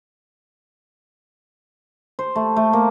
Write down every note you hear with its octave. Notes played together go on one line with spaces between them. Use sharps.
C5
A3
A3
A#3